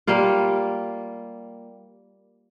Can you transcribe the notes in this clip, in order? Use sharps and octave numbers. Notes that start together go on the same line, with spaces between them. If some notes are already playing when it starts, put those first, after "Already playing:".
G3 A#3 F4